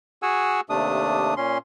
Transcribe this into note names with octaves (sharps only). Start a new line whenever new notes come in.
F#4 G#4 F#5 G#5 E6
D#2 C3 A3 D4 D#6
A#2 C#4 C6